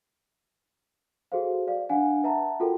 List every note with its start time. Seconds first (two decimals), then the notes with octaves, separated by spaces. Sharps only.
1.32 F#4 G#4 A4 C5 F5
1.67 D5 F5
1.89 D4 F5 F#5 G#5
2.24 B4 E5 F#5 A5 A#5
2.60 F4 F#4 A4 A#4 G5